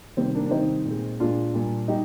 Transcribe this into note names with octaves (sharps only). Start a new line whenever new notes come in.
C3 D#3 G3 C4
A#3 D4
D4
C3 D#3 G3 C4 D#4
A#2
G#3
A#2 G#3 D4 F4
A#2 G3
G3 D#4 G4